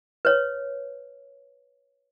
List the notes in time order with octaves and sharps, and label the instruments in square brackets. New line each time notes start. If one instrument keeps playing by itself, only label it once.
[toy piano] B4 C#5